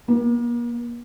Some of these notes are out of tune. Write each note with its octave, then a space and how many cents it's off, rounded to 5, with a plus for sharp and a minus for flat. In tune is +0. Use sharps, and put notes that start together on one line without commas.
A#3 +40